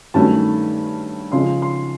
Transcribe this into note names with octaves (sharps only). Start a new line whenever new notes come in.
G2 D#3 F#3 A3 C#4 A5
C#3 F3 G#3 C6
C6